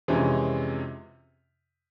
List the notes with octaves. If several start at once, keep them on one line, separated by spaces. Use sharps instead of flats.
F2 C3 E3 G#3 C#4